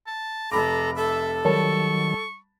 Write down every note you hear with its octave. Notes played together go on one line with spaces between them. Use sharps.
A5
F1 A4 A#5 B5 D6
A4 E5
D#3 F#3 G3 A5 C#6